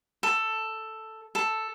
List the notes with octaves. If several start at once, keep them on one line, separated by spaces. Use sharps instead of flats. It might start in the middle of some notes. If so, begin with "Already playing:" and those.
A4
A4